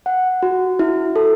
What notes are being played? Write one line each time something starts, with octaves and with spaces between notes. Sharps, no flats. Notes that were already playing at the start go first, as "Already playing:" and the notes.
F#5
F#4
E4
A4